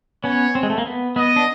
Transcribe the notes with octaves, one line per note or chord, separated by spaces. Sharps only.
B3 C#4 C#5
C4
G#3
A3
A#3
B3
B3 D#5
D4